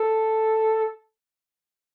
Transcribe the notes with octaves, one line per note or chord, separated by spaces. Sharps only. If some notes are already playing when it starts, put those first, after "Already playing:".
Already playing: A4